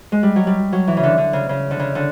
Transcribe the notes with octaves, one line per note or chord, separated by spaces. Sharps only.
G#3
G3
F#3
G3
F#3
E3
C#3
D3
D3
C#3
C#3
D3
C#3
D3